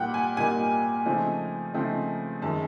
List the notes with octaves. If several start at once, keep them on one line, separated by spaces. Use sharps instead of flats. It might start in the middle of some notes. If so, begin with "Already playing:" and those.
Already playing: A#2 G3 A#3 D#4 F#5 G5
G#5
A#2 G3 A#3 D#4 G#5
C#3 F3 A3 C4 D#4
C#3 F3 A3 C4 D#4
F#2 D#3 G#3 A5